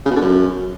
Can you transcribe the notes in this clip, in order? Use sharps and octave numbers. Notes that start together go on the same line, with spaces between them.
C#3
B2
D3
F#2